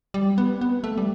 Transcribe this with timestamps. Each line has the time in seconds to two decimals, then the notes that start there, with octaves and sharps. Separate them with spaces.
0.14 G3
0.38 B3
0.61 B3
0.84 A3
0.98 G3